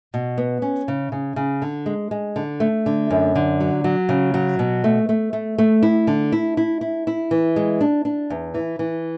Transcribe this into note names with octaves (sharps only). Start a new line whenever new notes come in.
B2
B3
C#4
C#3
C#3
C#3
D3
G#3
G#3
D3
A3
D3
F#2
D3
F#3
F#3
C#3
F#3
B2
A3
A3
A3
A3
E4
D3
E4
E4
E4
E4
E3
G#3
D4
D4
E2
E3
E3